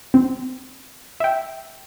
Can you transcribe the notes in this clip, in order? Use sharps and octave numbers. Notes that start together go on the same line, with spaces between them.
C4
E5 G5